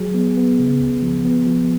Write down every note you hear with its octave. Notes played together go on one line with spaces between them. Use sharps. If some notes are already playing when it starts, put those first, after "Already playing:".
Already playing: F#3 G#4
B3
B3
C#3
C#2
F3
B3
F3